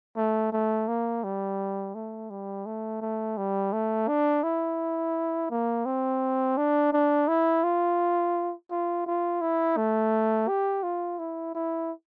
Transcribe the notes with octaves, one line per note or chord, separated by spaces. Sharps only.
A3
A3
A#3
G3
A3
G3
A3
A3
G3
A3
D4
E4
A#3
C4
D4
D4
E4
F4
F4
F4
E4
A3
G4
F4
E4
E4